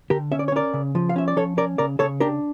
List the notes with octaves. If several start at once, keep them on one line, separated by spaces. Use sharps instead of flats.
D3 G4 A#4
C#4 E5
D5
C#5
C#4 A#4 D5
C#3
F3
F5
C#4 E5
D5
F3 A4 C#5
C#4 A#4 D5
C#3 A#4 D5
C#3 A4 C#5
D4 G4 A#4